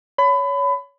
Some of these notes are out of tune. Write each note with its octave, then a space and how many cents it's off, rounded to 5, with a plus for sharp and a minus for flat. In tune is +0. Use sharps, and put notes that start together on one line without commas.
C#5 +20 B5 +25